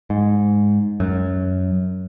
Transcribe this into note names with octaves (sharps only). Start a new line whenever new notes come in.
G#2
F#2